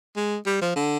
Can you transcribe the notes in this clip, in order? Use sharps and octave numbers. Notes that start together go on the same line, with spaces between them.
G#3
G3
F3
D3